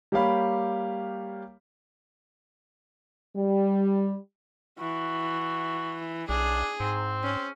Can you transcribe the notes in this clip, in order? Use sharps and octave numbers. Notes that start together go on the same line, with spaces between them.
G3 A#3 G4 C#5 F5 B5
G3
E3 F#4
B1 D4 G#4
G#2 C4
C#4